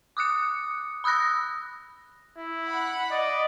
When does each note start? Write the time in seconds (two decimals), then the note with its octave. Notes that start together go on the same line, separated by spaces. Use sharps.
0.17 D6 D#6 F#6 C#7
1.04 B5 D#6 E6 F#6 A#6
2.37 E4
2.68 F#5 B5
3.11 D5 D#5